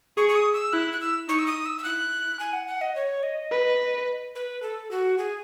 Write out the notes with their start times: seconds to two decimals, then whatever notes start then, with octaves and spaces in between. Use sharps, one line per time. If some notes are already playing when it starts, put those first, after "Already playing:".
0.17 G#4 C#6
0.29 C#6
0.36 D#6
0.54 E6
0.73 E4 F#6
0.92 F#6
1.01 E6
1.28 D#4 C#6
1.39 E6
1.46 D#6
1.66 E6
1.78 E6
1.84 E4 F#6
2.40 G#5
2.53 F#5
2.67 F#5
2.81 D#5
2.96 C#5
3.23 D#5
3.52 B4
4.35 B4
4.62 A4
4.91 F#4
5.18 G#4